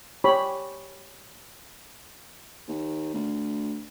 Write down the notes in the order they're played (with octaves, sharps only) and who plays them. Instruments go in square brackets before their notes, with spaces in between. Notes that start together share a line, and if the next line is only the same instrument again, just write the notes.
[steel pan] G4 C#5 B5
[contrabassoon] D#2
D2